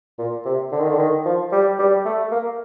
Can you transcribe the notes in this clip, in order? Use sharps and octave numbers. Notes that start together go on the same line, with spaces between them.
A#2
C3
D3
D#3
D3
D#3
F3
G3
G3
A3
A#3